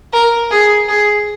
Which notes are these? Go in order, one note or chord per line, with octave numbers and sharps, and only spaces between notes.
A#4
G#4
G#4